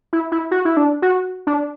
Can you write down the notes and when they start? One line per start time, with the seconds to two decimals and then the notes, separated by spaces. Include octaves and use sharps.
0.13 E4
0.32 E4
0.51 F#4
0.65 E4
0.77 D4
1.02 F#4
1.47 D4